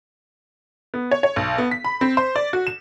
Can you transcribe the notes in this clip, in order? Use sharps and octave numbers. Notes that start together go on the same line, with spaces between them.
B3
C#5
C#5
B1
B3
B6
B5
C4
C5
D5
F#4
E7